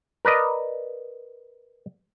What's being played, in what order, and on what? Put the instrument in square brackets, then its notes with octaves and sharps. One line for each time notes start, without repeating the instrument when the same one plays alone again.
[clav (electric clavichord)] A#4 B4 D5 D#5